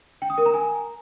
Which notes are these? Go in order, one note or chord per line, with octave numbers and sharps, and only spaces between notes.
G5
D#6
A#4
A#5
G#5